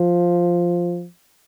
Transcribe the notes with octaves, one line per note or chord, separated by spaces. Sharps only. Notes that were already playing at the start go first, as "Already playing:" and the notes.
Already playing: F3